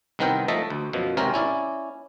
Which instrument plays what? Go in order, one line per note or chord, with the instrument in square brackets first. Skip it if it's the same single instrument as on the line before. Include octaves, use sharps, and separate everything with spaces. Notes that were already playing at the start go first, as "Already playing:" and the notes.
[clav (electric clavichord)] C2 D#3 B3 C4 A#4 G5
F3 A3 D#5 E5 A5
D2
F#2 B2 F3
G#1 C3 C4 C#4 A#4 C5
C#4 E4 D5